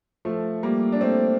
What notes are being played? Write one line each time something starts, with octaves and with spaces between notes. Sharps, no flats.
F3 A3
G3 A#3
D4
A3 C4